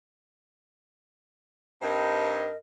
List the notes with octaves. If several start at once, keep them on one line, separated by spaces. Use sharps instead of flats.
G2 C4 D#4 A#4 D#5